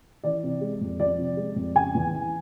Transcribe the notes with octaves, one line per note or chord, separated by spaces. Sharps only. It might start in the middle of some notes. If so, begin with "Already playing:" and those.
E3 D5
C3
G#3
F2
F3 D5
C3
G#3
F2
C#3 G#5
E2
E3